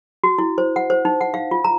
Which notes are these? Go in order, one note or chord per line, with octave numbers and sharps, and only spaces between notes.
F#4
E4
C5
F#5
C5
D#4
F#5
F5
F4
A#5